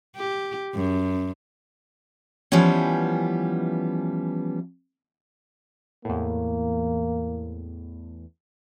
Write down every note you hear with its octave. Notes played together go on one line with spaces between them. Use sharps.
G4
F#2
E3 F3 G3 B3 C#4
E2 A2 A#3